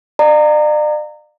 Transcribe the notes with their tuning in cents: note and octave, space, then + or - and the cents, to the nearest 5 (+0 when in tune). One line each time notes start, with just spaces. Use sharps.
D5 +40 F5 +0 A#5 -25